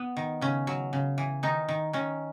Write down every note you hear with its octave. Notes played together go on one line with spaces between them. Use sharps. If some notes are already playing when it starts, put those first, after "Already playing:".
Already playing: B3
D#3
C#3 C#4
F#3
C#3
E3
D#3 D#4
D#3
D#3 C#4